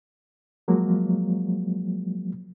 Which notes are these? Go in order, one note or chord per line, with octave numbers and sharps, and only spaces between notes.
F3 F#3 G#3 A#3